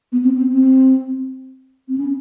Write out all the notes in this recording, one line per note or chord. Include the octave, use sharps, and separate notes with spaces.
B3
C4
C4
C4
C4
C#4